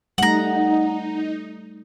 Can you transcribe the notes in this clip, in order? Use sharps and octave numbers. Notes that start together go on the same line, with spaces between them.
G3 A3 D#4 F#5 A#5